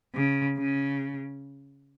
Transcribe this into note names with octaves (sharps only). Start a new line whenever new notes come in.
C#3
C#3